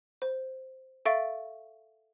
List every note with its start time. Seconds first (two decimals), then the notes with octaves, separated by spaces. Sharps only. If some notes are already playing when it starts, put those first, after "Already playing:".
0.22 C5
1.05 A4 E5 F5 C#6 A6 D7